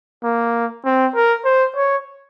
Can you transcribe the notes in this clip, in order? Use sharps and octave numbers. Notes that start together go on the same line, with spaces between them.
A#3
C4
A#4
C5
C#5